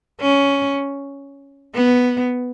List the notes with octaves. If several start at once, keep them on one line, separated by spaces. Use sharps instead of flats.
C#4
B3